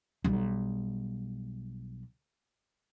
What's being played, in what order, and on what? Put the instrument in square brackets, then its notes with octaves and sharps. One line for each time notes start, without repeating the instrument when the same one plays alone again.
[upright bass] B1 G3